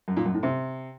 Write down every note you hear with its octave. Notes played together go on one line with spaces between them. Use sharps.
F#2
A#2
F#2
A2
C3